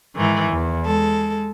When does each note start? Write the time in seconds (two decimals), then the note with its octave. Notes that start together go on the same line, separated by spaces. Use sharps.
0.16 G#2 D#3 E3
0.50 E2
0.84 G#3 A4